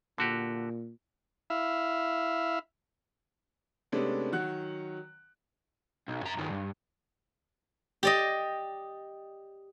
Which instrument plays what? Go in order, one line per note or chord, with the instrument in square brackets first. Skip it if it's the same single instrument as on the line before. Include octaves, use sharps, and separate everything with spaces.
[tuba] A#2 [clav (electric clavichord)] D3 F#4 G4
[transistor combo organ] E4 E5 F5
[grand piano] C3 G#3 A3 B3 C#4 D4
D#3 F#3 F#5 F#6
[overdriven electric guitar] B1
F#2 A#5
G2 D#3
G2
[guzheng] G4 D5 D#5